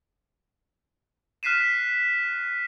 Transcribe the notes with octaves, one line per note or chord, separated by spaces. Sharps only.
F6 F#6 B6 C7 D#7 E7